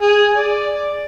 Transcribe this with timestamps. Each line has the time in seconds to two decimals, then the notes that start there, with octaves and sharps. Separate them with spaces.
0.02 G#4
0.35 D5